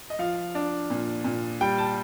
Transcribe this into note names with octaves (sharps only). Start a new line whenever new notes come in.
D#5
F3 F5
D4
A#2
A#2
G3 G5
A5